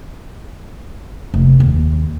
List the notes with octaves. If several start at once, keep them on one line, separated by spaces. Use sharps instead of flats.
F1
D#2